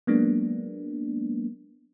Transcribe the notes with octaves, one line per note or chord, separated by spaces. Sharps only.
F#3 G#3 A#3 B3 D4